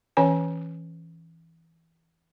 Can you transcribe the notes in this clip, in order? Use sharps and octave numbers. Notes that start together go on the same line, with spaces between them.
E3 C#4 C#5 G#5